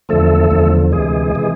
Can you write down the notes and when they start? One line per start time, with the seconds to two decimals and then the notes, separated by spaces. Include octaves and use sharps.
0.09 E2 D3 F3 A3 A4
0.51 E2 D3 F3
0.92 D2 C3 E3 G#3 G#4
1.35 C3 E3